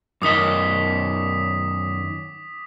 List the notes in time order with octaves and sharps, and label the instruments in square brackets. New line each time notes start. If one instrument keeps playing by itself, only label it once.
[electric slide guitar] F#2 D#3 D#5 [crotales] D6 D#6 B6